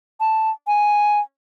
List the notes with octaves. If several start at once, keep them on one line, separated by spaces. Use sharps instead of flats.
A5
G#5